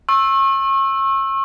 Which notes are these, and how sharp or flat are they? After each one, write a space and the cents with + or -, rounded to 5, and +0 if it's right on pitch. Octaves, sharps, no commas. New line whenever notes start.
C#6 -35 E6 +0